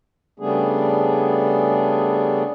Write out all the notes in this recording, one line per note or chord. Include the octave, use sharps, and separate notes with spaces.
C#3 G3 A3 B3 D4 G#4